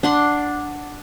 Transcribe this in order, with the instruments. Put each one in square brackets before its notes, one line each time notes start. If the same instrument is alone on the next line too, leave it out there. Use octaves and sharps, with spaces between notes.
[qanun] D4 F#5 C6